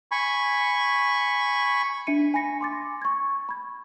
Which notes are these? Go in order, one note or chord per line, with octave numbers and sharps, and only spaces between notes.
G#5 B5 C#6
D4 E5 C#7 D#7
G#5 B5 A#6 C#7
C6 D6 A6
C#6 G#6
B5 G#6